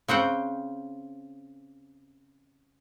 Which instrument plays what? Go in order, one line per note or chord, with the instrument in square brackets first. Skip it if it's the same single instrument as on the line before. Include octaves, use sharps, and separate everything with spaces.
[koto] C#3 C4 F#5 G5